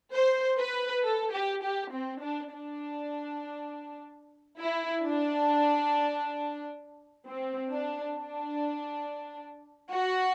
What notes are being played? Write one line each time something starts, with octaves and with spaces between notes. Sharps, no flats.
C5
B4
A4
G4
G4
C4
D4
D4
E4
D4
C4
D4
D4
F#4